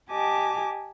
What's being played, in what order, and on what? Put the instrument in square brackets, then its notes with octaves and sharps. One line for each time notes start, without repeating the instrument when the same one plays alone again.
[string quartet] G4 D#5 G#5 A5 D6